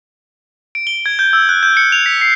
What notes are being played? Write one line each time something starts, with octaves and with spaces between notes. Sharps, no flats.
D7
G7
G#6
G6
E6
F#6
G6
C#7
F7
B6
C7